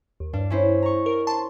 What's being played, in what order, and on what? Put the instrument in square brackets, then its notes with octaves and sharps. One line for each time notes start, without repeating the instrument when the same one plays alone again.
[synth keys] D#2
[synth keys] G2 [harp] D4
[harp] C#4 E4 C5
A#5 C#6
[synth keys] A#4
A5 C6